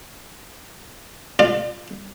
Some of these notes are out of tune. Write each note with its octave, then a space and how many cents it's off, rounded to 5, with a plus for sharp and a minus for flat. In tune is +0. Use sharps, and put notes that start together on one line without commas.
F4 +0 D5 +35